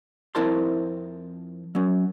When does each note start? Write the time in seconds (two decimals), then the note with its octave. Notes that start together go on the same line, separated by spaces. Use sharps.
0.35 F2 C4 E4 A#4 A5 C6
1.75 F#3 C#4